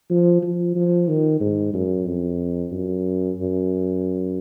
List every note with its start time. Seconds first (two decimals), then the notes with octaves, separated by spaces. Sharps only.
0.10 F3
0.43 F3
0.75 F3
1.08 D#3
1.40 G#2
1.74 F#2
2.07 F2
2.72 F#2
3.37 F#2